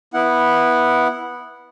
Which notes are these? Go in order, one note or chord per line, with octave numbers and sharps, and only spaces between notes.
B3 E4 F#5